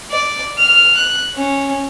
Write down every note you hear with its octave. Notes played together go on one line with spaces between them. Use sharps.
D5
F6
F#6
C#4